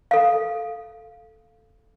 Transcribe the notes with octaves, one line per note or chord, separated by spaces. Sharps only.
A4 F5